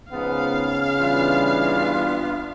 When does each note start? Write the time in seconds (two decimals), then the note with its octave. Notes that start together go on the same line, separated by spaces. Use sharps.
0.12 G#2 C#3 F3 B3 F5
1.00 E3 G3 B3 D4 F4